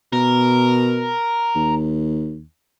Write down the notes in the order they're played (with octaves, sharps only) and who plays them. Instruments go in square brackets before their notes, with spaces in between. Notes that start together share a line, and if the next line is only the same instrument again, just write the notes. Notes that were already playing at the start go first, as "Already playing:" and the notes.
[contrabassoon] B2 [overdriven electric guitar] A#4
[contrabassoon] D#2